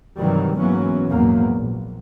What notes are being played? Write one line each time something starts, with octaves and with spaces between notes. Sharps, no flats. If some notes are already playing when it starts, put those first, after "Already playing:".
G2 C3 D#3 E3 F#3 G3
G#2 E3 F#3 A#3 B3 C#4
A#1 E2 G#2 F#3 A#3
A#1